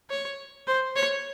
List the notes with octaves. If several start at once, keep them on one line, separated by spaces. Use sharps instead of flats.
C#5
C5
C#5